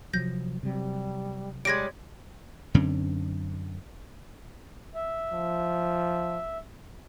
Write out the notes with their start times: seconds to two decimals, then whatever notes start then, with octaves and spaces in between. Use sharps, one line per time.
0.13 C3 F3 F#3 G6 A#6
0.63 C3 F#3 G3
1.65 G3 G#3 C#5 G#6 A#6 D7
2.74 F#2 D3 C4 C#4
4.95 E5
5.32 F3